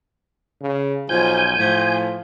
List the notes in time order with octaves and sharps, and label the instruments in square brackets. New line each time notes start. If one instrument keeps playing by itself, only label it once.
[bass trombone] C#3
[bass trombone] B1 [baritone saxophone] F3 [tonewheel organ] G#5 G6
[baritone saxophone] A2 [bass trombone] F3